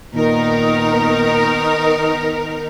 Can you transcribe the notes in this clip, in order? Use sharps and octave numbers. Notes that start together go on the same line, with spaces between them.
A#2 D#3 B3 D#4 A#4